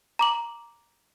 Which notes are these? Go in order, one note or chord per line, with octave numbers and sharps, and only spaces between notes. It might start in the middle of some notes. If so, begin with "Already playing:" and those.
A#5 D6 F#7